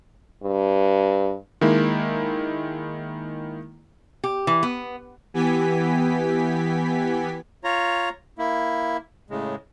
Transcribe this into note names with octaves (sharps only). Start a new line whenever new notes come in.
G2
D#3 G#3 A#3 E4
G4
E3
B3
E3 B3 G4 G#5 B6
F4 C#5 A#5
A#3 E4
A2 C#3 G#3